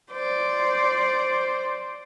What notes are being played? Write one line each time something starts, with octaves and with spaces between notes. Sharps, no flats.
C5 D5